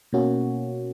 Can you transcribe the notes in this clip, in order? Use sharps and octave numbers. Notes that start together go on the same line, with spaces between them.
B2 A#3 C#4 F#4